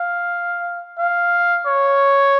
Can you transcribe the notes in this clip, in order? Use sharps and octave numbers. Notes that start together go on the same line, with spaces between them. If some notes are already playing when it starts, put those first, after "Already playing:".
Already playing: F5
F5
C#5